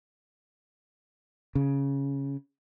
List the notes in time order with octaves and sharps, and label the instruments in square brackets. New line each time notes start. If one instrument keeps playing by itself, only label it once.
[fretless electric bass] C#3